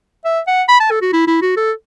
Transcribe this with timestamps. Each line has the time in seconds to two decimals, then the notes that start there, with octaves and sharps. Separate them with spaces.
0.25 E5
0.47 F#5
0.68 B5
0.80 A5
0.91 A4
1.02 F#4
1.13 E4
1.27 E4
1.42 F#4
1.56 A4